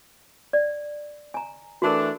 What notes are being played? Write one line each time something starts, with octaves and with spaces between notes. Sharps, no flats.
D5
G#5 A#5
E3 A3 D4 F#4 A#4